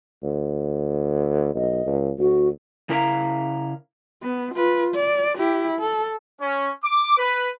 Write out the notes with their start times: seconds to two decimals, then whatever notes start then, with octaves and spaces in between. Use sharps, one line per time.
0.23 D2
1.55 B1 D#5
1.86 C#2
2.19 D2 F#4
2.89 C#3 E4 A#4 E5 F5 A#5
4.23 B3
4.55 F4 B4
4.95 D5
5.38 E4 G4
5.80 A4
6.40 C#4
6.83 D6
7.17 B4